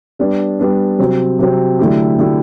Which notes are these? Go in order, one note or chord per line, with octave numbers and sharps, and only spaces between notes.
G3 B3 D4
G3 B3 D4
C3 F#3 C4
C3 F#3 C4
D3 F#3 A3 E4 G4
D3 F#3 A3 E4 G4